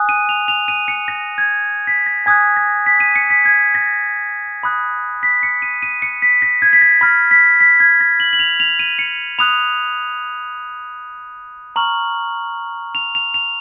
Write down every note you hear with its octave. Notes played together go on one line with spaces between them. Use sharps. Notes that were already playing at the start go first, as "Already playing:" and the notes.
Already playing: G#5 D#6 F#6
D#7
F7
F7
D#7
C#7
A#6
G#6
B6
A#6
G#5 D#6 F#6 G#6
A#6
B6
D#7
C#7
B6
G#6
A#6
B5 D#6 F#6
B6
C#7
D#7
D#7
C#7
B6
A#6
G#6
B6
A#6
B5 F6 A#6
B6
B6
G#6
A#6
F#7
F#7
F7
F7
D#7
C#7
B5 D#6 F#6 F7
A#5 C#6 F6 F#7
F7
F7
F7